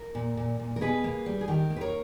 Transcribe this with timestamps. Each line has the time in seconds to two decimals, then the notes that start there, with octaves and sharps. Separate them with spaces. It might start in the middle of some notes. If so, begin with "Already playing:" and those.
Already playing: A#4
0.15 A#2
0.37 A#2
0.59 A#2
0.76 A#4
0.81 B2 G#4 B4
1.04 A#3
1.26 G3
1.41 G#4
1.48 D#3 G4 A#4
1.70 A#3
1.76 B4
1.81 A#4 C#5